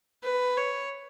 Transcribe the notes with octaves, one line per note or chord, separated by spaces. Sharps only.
B4
C#5